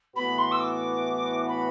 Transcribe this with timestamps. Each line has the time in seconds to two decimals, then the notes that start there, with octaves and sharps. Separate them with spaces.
0.16 A2 E3 B3 F#4 B4 B5
0.38 C6
0.51 E6
0.60 D6
1.48 B5